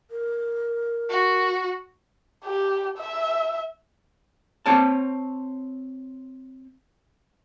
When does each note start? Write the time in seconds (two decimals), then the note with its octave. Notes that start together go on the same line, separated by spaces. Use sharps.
0.11 A#4
1.10 F#4
2.45 G4
2.98 E5
4.66 C4 C#5 A5